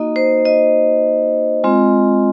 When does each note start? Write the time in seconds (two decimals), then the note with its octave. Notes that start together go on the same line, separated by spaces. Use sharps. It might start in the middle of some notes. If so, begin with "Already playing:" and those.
Already playing: A#3 D#4 F#4 D#5
0.16 C5
0.45 D#5
1.64 G#3 C4 F4